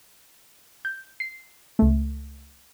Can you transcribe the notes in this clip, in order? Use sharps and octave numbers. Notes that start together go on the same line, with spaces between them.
G6
C7
C#2 A3